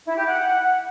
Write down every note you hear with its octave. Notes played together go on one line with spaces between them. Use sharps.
E4
G4
F#5